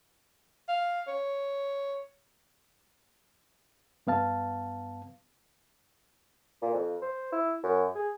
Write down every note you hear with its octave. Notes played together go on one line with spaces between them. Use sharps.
F5
C#5
G2 B3 F5 A5
A#2
F2
C5
E4
F#2
G#4